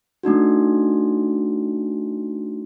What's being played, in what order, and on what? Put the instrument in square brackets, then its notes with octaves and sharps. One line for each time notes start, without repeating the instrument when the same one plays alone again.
[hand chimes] A3 D4 D#4 F#4